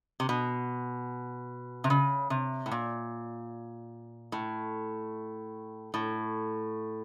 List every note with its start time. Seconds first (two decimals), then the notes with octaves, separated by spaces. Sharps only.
0.20 C3
0.29 B2
1.84 C3
1.90 C#3
2.30 C3
2.66 A2
2.71 A#2
4.32 A2
5.94 A2